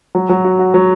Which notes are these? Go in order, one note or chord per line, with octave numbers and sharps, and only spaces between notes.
F#3
F#3
F#4
F#4
F#3